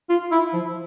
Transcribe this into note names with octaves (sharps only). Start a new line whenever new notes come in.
F4
E4
F3